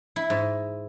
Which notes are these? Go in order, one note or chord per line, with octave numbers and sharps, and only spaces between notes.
E4
G#2